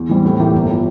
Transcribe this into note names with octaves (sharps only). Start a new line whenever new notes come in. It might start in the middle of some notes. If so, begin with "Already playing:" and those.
Already playing: E2
E3 G3 C4
A2
E3 A#3 E4 G4
G1
F3